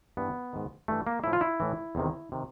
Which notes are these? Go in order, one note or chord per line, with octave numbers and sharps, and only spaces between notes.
G2 E3 B3
G#2 D#3
G2 E3 A3
A#3
A2 F3 E4
F4
E4
A2 E3
E2 C3 D#3
C3 D#3